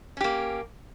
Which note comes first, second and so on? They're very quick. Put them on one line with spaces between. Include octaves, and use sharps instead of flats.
C#4 G4 A#3